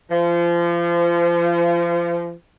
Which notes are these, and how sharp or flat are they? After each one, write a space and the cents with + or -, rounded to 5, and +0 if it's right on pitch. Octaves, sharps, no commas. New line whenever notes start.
F3 -30